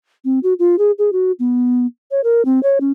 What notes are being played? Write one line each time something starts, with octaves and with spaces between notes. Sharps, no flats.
C4
F#4
F4
G#4
G#4
F#4
B3
C#5
A#4
C4
C#5
C#4